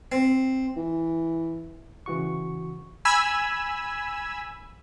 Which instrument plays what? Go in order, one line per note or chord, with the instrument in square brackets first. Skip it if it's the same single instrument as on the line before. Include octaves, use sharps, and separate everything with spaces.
[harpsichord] C4
[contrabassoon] E3
[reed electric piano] C#3 E3 F#4 C#6
[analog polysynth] G#5 B5 E6